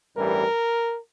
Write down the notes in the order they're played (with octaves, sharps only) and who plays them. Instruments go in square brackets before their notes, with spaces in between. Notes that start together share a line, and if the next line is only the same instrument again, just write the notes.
[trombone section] A1 G2 E3 G3 A#4